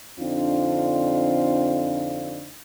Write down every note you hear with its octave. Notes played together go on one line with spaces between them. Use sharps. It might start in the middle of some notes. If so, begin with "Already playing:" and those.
F2 D3 C4 D4 D#4 F4